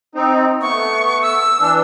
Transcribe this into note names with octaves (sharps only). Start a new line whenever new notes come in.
C4 D#4
A3 B3 C#6
E6
E3 D4